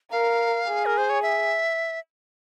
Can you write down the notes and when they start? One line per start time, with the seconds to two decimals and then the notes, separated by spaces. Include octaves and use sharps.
0.11 A#4 F5
0.67 G#4
0.86 A#4
0.98 C5
1.10 C#5
1.22 E5